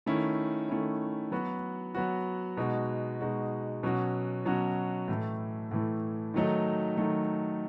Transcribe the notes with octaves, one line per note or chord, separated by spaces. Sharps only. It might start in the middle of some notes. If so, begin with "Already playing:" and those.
D#3 A3 C#4 E4
D#3 A3 C#4 E4
F#3 B3 F#4
F#3 B3 F#4
B2 G#3 D#4 F#4
B2 G#3 D#4 F#4
B2 F#3 C#4 F#4
B2 F#3 C#4 F#4
A2 E3 A3
A2 E3 A3
D#3 F#3 A3 D#4
D#3 F#3 A3 D#4